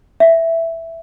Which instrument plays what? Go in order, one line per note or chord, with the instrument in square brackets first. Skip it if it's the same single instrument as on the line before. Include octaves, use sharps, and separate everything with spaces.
[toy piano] E5